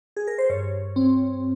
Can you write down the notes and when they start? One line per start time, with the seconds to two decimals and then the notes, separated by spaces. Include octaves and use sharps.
0.17 G#4
0.27 A#4
0.38 C5
0.49 G2 C#5
0.96 C4